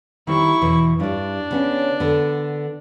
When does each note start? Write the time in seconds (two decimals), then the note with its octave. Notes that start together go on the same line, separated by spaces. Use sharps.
0.27 D#3 G3 C4 E4 C#6
0.62 E2 B2 E3
1.00 G2 G3 D4
1.51 C#3 B3 C#4
2.00 D3 B3